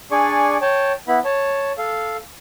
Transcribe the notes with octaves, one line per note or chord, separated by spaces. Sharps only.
D4 G#4 D5 G#5 C#6
C#5 G5 A5
B3 E4 B5
C#5 A5
A4 F5